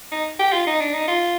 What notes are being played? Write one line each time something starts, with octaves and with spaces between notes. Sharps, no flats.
D#4
G4
F4
D#4
D4
D#4
F4